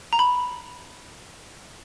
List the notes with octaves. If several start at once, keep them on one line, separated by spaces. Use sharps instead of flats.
A#5
B5